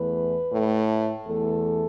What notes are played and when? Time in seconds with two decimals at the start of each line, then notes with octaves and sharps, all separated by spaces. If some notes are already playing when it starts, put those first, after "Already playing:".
Already playing: E2 E3 A3 B4
0.51 A2 A3
1.26 E2 E3 A3 A4